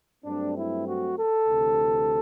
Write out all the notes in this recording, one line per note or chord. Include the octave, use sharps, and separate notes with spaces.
G2 F#3 A3 C4 D4
E4
F#4
A4
D2 C3 E3